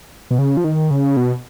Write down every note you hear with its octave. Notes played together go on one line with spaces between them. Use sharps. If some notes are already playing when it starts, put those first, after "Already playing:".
B2
C#3
F3
D#3
C#3
B2